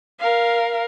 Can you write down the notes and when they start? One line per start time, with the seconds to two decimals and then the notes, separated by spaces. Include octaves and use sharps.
0.19 A#4 F5